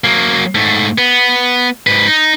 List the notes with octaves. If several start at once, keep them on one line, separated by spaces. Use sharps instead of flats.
F#3 A#3
G#2 A3
B3
G#2 B4
D#4